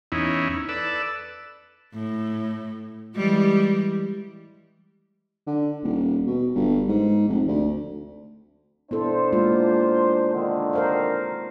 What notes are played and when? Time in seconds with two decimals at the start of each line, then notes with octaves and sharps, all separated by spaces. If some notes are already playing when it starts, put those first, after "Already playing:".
0.12 E2 C#4 D#4 E4
0.69 A4 B4 D5 E6
1.93 A2
3.16 E3 G3 G#3
5.47 D3
5.83 D#1
6.27 B2
6.55 G1
6.88 G#2
7.28 F1
7.48 D2
8.91 B3 D4 E4 A4 C5
9.32 G#3 A#3 F4
10.34 D3 D#3
10.73 A#4 C5 F5